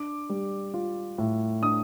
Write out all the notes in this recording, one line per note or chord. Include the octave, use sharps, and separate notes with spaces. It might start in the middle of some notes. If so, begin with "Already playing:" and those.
Already playing: D4 D6
G3
F4
A2
D4 D#6